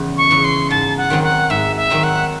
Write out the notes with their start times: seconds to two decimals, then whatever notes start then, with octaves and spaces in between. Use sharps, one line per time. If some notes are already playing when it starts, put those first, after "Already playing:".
Already playing: E2 C#3 E3
0.17 C#6
0.31 C#3 E3
0.44 C6
0.70 G#2 A5
0.97 F#5
1.10 D#3 F#3 C4 D#4
1.23 F#5
1.50 G#2 E5
1.76 E5
1.90 D#3 F#3 C4 D#4
2.04 F#5